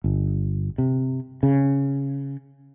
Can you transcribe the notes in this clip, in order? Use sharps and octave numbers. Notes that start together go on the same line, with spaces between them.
G1
C3
C#3